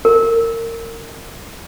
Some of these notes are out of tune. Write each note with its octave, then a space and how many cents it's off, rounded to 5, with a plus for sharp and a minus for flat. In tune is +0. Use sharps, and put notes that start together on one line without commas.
A#4 -25